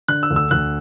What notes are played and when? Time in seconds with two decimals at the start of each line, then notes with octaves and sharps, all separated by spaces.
0.08 D3 F#6
0.23 E6
0.30 D2
0.36 E6
0.51 D2 F#6